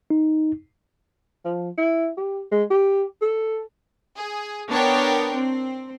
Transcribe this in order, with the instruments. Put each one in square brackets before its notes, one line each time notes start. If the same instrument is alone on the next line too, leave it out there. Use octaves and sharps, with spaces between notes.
[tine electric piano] D#4
[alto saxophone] F3
E4
G4
G#3
G4
A4
[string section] G#4
B3 D4 A#4 C#5 G5
C4